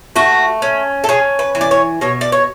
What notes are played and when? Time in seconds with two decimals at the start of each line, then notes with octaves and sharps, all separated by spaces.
0.16 A3 F#4
0.62 C#4
1.04 A4
1.09 C#4 G#4
1.39 B4
1.55 E3
1.61 D5
1.71 C#5
2.01 B2 C#5
2.21 D5
2.32 C#5